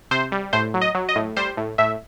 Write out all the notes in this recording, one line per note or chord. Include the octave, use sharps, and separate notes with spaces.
C3 C5
G3
A2 C5
F#3
D#5
F#3
D#5
A2
G3 C5
A2
A2 E5